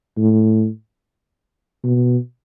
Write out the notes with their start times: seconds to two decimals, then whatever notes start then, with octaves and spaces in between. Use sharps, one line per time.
0.17 A2
1.83 B2